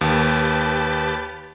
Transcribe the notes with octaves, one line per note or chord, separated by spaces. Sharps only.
D#2 G4 B4 A5